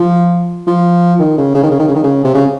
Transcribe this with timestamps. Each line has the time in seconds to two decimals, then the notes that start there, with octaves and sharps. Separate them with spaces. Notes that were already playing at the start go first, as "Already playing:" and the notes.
Already playing: F3
0.67 F3
1.20 D#3
1.37 C#3
1.55 C#3
1.63 D#3
1.71 C#3
1.79 D#3
1.88 C#3
1.96 D#3
2.04 C#3
2.25 C3
2.34 C#3